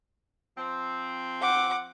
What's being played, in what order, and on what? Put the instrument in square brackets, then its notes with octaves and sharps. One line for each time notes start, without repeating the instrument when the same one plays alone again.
[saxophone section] F3 C4
[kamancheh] F#5 D6